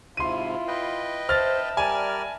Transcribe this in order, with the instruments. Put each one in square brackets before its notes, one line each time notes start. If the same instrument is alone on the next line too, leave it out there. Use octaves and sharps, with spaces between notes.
[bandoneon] G#2 C3 [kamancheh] E4 F4 [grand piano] C6 D#7
[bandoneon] B4 D#5 G5
[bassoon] C5 [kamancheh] E5 A5 [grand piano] F6 A6
[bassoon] G3 [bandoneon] A#4 D5 F6 [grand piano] G#5